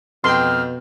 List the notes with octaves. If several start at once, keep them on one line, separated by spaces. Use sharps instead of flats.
F2 B2 G5 C6 F6